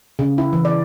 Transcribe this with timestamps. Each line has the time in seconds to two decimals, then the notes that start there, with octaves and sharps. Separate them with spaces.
0.19 C#3
0.38 E4
0.53 E3
0.65 D5